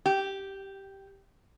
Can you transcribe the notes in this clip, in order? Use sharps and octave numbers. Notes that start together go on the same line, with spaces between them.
G4